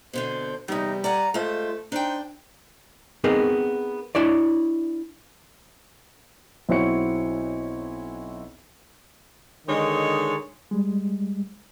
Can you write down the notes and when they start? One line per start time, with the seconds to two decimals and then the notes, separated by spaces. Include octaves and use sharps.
0.13 B2 D3 C4 C5
0.68 E2 C3 G3 D#4
1.04 D5 F#5 G#5 A#5
1.34 G#3 A3 F4 C5
1.92 D4 D#4 C5 G5
3.24 B3 C4 D#4 G#4 A#4
4.15 D4 E4 C#5 D5
6.69 B1 C4 E4 F#4 C#5 C#7
9.67 D3 D#3 G#3 D#4 C#5
10.71 G3 G#3